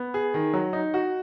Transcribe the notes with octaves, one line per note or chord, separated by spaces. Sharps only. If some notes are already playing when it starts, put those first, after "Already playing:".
Already playing: B3
G#4
D#3
F#3
D#4
F#4